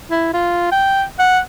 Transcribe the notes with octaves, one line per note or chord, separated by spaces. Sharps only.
E4
F4
G5
F#5